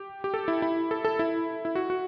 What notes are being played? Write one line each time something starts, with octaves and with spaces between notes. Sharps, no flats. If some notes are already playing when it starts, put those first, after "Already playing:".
Already playing: G4
G4
A4
E4
E4
A4
A4
E4
E4
F#4
F#4